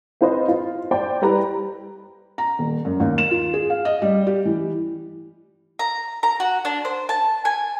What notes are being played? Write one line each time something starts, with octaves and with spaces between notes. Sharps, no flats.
C4 F4 B4 C5 D#5
F4
C5 D5 G5
G3 E4 B4 A#5
A#5
D#1
F#2
D#2
E7
F4
G#4
F5
D#5
G3
G4
E3
A#5
A#5
F#4
D4
C5
A5
G#5